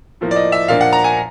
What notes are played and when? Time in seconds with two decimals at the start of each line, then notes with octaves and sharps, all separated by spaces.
0.21 A2 F3 A#3
0.31 D5
0.36 D#5
0.52 E5
0.68 A#2 F3 A#3 D4 F5
0.81 F#5
0.93 A#5
1.04 G#5